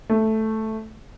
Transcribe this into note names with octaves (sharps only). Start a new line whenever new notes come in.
A3